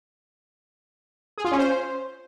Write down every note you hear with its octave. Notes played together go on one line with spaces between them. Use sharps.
G#4
F4
C#4
C5